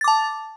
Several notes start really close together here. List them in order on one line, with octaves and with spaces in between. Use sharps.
A6 D6 A5